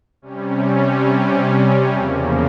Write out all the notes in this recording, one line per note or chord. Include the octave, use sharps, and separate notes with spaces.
C3 G3 C#4
E2 C#3 F3 A#3